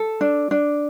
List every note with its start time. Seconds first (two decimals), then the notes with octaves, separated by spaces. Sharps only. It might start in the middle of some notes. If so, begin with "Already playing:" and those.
Already playing: A4
0.21 D4
0.51 D4